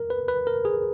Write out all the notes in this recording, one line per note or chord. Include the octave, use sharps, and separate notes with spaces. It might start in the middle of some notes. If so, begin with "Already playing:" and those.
Already playing: A#4
B4
B4
A#4
G#4